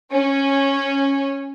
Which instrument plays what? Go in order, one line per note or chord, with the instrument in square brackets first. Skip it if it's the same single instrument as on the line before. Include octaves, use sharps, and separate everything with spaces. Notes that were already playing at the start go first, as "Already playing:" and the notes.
[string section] C#4